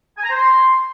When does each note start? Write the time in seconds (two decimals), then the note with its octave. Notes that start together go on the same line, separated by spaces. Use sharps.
0.17 G#5
0.23 A#5
0.29 C5
0.35 C6